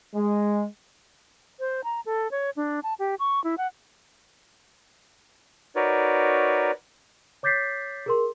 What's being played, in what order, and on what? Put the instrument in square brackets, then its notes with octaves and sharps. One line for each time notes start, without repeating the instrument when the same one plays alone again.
[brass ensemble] G#3
[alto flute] C5
A#5
A4
C#5
D4
A5
G4
C#6
E4
F#5
[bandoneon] D#4 F#4 A#4 B4 C#5 D5
[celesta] C#5 D6 G6 A6 B6 C7
G#4 A#4 C6